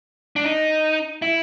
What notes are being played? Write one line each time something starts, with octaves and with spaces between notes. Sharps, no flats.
D4
D#4
E4